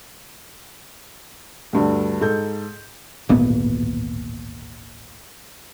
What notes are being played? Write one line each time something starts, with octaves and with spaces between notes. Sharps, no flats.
D2 G2 D3
G#2 A4 G6
D1 G#1 A#2 B3